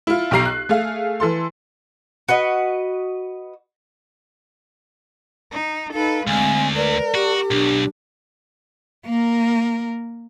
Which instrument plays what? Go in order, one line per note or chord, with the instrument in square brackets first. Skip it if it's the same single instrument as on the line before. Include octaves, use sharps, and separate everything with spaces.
[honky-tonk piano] E4 F4
B1 G4 A#5 C7
F#6
A3 G#4 F5
E3 A4 C6
[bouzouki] F#4 B4 D#5
[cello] D#4
[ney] D#4 [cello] A4 B4 [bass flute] F5
[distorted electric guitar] D2 [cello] G#3 C4 [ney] G#5
[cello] A#4 [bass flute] B4 [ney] D5
[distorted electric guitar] F#4 [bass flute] G4
[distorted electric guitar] B1 [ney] D4
[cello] A#3 A#4